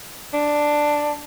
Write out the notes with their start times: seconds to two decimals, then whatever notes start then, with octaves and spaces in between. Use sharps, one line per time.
0.34 D4